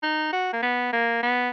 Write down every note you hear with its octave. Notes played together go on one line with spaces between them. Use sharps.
D#4
F#4
A#3
B3
A#3
B3